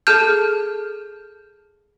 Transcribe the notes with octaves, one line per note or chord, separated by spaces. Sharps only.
G#4 A4 A5 F6 G6